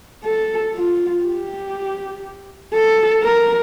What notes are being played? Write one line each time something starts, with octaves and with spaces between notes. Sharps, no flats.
A4
F4
G4
A4
A#4